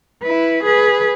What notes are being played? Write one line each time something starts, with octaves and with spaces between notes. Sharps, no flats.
E4 B4
G#4 B4